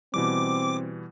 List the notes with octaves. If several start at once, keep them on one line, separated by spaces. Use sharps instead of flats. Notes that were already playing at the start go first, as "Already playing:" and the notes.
B2 E3 G3 C4 D6